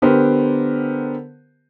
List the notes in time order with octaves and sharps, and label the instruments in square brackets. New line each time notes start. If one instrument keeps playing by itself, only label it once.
[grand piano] D3 B3 G4 A#4 C5